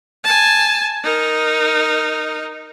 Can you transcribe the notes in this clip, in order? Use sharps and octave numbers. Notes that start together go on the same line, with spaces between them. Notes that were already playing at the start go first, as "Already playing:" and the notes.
G#5 A5
D#4 A#4